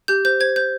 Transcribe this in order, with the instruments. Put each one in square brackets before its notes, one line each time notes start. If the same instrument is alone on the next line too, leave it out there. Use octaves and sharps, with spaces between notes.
[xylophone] G4 G6
C5 G6
C5 G#6
C5 G6